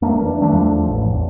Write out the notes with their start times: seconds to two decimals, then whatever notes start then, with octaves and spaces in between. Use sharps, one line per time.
0.02 F2 A3 A#3 D4
0.22 E3 D4
0.41 D#3 G3 A3 D4
0.53 E2 F3 A3 D4
0.88 A1
1.07 E2